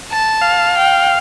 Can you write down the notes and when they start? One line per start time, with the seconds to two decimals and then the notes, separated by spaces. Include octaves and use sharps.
0.11 A5
0.41 F5
0.77 G5